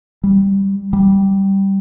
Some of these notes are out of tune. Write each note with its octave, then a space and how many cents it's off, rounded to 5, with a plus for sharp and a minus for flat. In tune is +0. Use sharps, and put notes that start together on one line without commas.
G3 +0
G3 -5